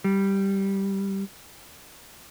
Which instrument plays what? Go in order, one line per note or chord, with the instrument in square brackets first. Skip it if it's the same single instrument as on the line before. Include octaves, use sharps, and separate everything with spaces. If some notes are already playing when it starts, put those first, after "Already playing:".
[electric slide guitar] G3